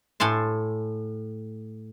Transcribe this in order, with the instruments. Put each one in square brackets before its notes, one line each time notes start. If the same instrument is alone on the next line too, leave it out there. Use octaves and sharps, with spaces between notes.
[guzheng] A2 G#5 A5 C6